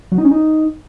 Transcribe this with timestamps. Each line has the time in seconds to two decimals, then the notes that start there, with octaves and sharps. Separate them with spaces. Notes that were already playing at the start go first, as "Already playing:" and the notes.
0.12 F#3
0.18 D#4
0.25 C#4
0.31 D#4